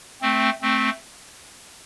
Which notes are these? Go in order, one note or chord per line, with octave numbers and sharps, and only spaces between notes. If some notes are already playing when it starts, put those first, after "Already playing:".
A3 C4
A3 C4